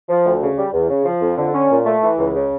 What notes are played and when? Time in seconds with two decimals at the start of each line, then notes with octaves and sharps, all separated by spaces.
0.09 F3
0.25 D2
0.41 C#3
0.57 G3
0.73 E2
0.89 C#3
1.06 F3
1.21 F2
1.37 D3
1.53 C#4
1.70 A#2
1.86 A3
2.02 E3
2.18 C#2
2.34 C#3